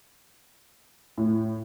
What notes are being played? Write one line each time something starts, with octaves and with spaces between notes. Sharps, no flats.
A2